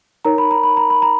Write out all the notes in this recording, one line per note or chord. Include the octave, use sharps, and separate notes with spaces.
D#4 A#4 C#5 A#5
B5
A#5
B5
A#5
B5
A#5